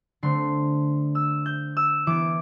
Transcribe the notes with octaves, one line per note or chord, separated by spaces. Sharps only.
D3 A3 C4 C6
E6
G6
E6
E3 B3 D6